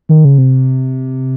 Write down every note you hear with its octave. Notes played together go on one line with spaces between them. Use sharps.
D#3
C#3
C3